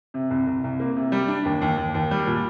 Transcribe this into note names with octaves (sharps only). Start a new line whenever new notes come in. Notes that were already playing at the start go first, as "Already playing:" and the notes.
C3
C2
C2
C2
A#3
C3
G3
D4
D#2
D#2
D#2
D#2
G3
A#2